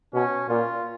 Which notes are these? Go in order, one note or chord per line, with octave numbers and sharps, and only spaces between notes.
B2 C#4
A#2 F4